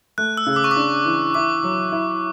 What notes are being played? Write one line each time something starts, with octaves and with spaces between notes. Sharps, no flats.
A3 F#6
E6
C#3
D6
C#6
D4 D6
E3
E4 D6
F#3
E4